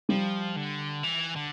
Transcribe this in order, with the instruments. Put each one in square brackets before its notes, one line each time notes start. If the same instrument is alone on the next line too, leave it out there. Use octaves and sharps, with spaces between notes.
[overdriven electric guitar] F3 [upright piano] G3
[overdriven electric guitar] D3
E3
D3